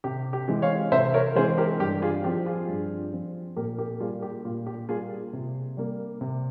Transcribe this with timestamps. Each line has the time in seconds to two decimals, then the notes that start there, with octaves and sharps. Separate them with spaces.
0.04 C3 G4
0.33 G4
0.48 E3 G#3 C4
0.62 C#5 F5
0.92 C3 C5 E5
1.14 A#4 C#5
1.36 E3 G#3 C4 G#4 C5
1.58 G4 A#4
1.80 G2 G4
2.02 F4 G#4
2.24 F3 C4 G4
2.46 F4 G#4
2.68 G2
3.13 F3 C4
3.56 A#2 G4 A#4
3.78 G4 A#4
4.00 G3 A#3 F4 G#4
4.22 G4
4.45 A#2 F4
4.67 G4
4.89 G3 A#3 F4 G#4
5.33 C3
5.77 G3 A#3
6.21 C3